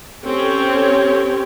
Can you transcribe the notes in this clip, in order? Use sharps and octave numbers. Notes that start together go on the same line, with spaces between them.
C4 C#4 G4 A4 C#5